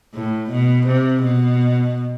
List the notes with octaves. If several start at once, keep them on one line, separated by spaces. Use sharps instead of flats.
A2
B2
C3
B2